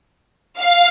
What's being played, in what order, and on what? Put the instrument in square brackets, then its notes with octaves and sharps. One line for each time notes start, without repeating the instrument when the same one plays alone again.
[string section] F5